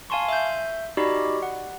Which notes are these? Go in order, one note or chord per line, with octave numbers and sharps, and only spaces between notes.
F5 G#5 A5 C6 C#6
E5 G6
D#4 F#4 G4 D5 D#5 B5
F#5